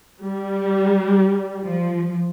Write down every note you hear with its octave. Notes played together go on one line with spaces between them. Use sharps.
G3
F3